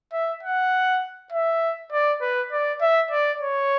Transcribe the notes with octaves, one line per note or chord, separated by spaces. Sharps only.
E5
F#5
E5
D5
B4
D5
E5
D5
C#5